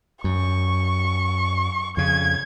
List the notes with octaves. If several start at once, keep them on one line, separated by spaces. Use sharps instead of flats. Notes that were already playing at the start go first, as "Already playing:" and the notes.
F#2 C#6
F2 C#3 G#6